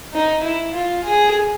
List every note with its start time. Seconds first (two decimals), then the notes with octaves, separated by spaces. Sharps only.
0.14 D#4
0.43 E4
0.74 F4
1.04 G#4